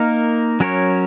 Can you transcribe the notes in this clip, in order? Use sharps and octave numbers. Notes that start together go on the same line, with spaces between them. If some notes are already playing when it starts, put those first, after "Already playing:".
Already playing: A#3 D#4 A#4
F#3 C#4 A#4 C#5